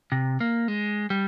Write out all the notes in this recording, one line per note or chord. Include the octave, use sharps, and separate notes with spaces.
C3
A#3
G#3
G3